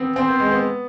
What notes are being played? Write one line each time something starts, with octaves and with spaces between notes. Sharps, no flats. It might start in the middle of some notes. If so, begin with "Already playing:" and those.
Already playing: B3 C4
C4 C5
B3
G#3
B3